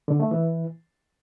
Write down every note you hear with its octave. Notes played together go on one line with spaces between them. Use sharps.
D3
A3
E3